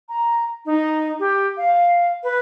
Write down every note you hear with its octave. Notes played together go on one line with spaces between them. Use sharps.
A#5
D#4
G4
F5
B4